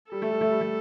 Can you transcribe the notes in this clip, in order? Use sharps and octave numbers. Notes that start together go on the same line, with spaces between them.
G3 A4
A3
G3
A3
G3
A3